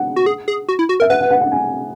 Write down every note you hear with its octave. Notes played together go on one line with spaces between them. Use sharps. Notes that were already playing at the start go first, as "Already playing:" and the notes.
Already playing: F#5
F#4
G#4
G#4
F#4
E4
F#4
A#4 E5
B4 F#5
F#5
F#5
F#5
G#5